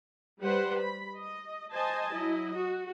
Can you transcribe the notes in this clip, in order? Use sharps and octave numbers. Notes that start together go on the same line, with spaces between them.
G3 G4 B4 C5 F#5
B5
D#5
C5 D#5 G#5 A5
F#3 E4 D#5
F#4